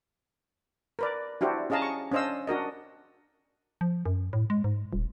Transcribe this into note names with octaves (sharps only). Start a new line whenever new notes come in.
A#4 B4 D5
D4 E4 F#4 G4 C5
C#4 G#4 D#5 F5 A5 A#5
C#6
C#4 D4 C5 D#5 F5 E6
D4 F#4 A#4 D#5
F3
F#2
A2
G#3
G#2
D#1